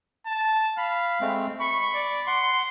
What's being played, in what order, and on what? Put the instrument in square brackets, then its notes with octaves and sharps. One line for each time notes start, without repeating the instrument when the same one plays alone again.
[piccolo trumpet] A5
[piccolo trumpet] F5 [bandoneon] B5
[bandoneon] G#3 A3 C4
[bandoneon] B5 [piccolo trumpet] C#6
[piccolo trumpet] D5
[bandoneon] F#5 [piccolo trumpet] C6